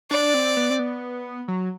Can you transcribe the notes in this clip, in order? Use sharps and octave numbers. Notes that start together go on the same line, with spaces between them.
D4 D5
C4
B3
C4
B3
F#3